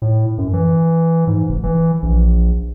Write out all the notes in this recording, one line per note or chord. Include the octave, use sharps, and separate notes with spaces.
A2
F#2
E3
G#2
F1
E3
A#1